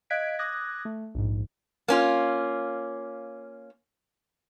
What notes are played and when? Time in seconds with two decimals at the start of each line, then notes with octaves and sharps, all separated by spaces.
0.10 D#5 F5 F#6 G#6 B6 D7
0.39 D6 D#6 F#6 G#6 A#6
0.85 A3
1.15 A#1 G#2
1.88 A#3 C#4 F4